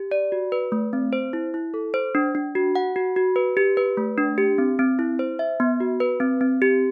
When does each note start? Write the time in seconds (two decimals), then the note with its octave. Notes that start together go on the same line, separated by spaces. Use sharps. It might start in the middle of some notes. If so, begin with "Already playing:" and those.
Already playing: G4
0.11 D5
0.32 F#4
0.52 B4
0.72 A3
0.93 C4
1.13 C5
1.33 E4
1.54 E4
1.74 A4
1.94 C5
2.15 D4
2.35 D4
2.55 F#4
2.76 F#5
2.96 F#4
3.16 F#4
3.36 B4
3.57 G4
3.77 B4
3.97 A3
4.18 D4
4.38 G4
4.58 C4
4.79 C4
4.99 E4
5.19 C5
5.39 E5
5.60 B3
5.80 F#4
6.00 B4
6.20 C4
6.41 C4
6.62 G4